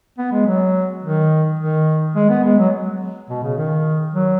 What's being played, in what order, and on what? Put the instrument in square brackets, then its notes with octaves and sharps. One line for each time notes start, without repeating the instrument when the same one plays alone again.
[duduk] B3
G#3
F#3
D#3
D#3
G#3
B3
G#3
F#3
B2
C#3
D#3
F#3